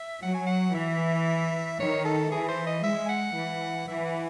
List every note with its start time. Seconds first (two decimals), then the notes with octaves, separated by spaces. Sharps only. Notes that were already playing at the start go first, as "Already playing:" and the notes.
Already playing: E5
0.22 F#3 F#5
0.34 G#5
0.47 F#5
0.74 E3 E5
1.79 D#3 C#5
2.05 A4
2.31 E3 G#4
2.48 C5
2.67 D#5
2.83 G#3 E5
3.06 G#5
3.09 F#5
3.36 E3
3.88 E3 E5
4.05 F#5